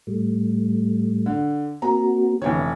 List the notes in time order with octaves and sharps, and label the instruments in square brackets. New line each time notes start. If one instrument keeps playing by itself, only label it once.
[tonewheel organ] A2 G3 A3
[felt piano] D3
[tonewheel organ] A#3 C4 F#4 [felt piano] A#5
[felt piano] F1 E3 C#5 [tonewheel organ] D3